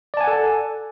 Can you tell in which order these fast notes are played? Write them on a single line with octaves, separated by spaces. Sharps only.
D5 A5 G#5 F#5 A4